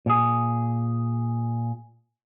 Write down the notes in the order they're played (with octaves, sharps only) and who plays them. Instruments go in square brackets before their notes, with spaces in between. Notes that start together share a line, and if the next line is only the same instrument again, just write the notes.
[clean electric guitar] A#2 G#4